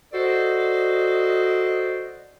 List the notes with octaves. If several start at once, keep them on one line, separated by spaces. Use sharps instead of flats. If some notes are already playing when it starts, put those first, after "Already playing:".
F#4 A4 C5 D5 D#5